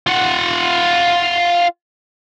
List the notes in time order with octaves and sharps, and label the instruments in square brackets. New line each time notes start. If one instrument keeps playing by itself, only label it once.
[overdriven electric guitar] F4 F#5